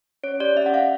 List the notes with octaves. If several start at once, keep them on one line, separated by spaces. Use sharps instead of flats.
C#4 C#5
G4 D5
C#4 E5
F#5
C#4 F5